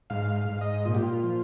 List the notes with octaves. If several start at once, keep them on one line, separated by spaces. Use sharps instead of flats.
G#2 F5
F5
G#2
D#5
A#2 F4
G4
F4
F3